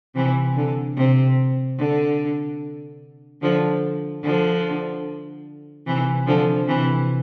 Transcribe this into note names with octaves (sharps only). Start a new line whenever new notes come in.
C3 E3
D3
C3
D3
D3 F3
D3 F3
C3 E3
D3 F3
C3 E3